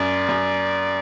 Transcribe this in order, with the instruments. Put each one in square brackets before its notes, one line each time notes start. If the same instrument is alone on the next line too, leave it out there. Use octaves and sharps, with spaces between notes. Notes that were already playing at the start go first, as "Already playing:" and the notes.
Already playing: [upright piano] F#2 [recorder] D5
[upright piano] F#2